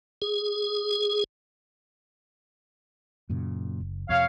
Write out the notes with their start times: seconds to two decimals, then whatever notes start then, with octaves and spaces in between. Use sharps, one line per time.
0.22 G#4
3.29 F#2 A#2 C#3
3.80 F#1
4.09 F2 C3 C#5 F5